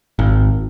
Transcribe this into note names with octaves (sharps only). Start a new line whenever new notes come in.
G#1